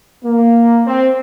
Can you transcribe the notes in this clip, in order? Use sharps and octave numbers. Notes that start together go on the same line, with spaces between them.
A#3
C4